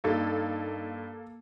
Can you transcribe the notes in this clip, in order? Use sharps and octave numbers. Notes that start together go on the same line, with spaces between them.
G2 A#3 D#4 A4 D#5 A6